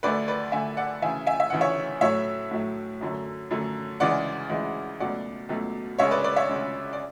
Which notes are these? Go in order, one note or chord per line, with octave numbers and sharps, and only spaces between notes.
D2 D3 A3 B4 D5
B4 D5
D2 D3 A3 E5 G#5
D5 F#5
D2 C#3 E3 E5 G#5
E5 G#5
E5
D2 C#3 E3 F#5
C#5 E5
A2 F#3 A3 C#5 E5
A2 F#3 A3
F#2 D3 F#3 A3
F#2 D3 F#3 A3
D2 C#3 E3 G#3 D5 F#5
D2 C#3 E3 G#3
C#2 B2 F#3 A3 D5 F#5
C#2 B2 F#3 A3
D2 C#3 G#3 C#5 E5
B4 D5
B4 D5
C#5 E5
D2 C#3 G#3
D5